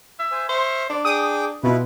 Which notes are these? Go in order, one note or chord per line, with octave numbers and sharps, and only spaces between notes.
E5
C5 G#5
C5 E5 C#6 F6
D4 D5
G#4 G5 D6 D#6
B2 E4 F4 B4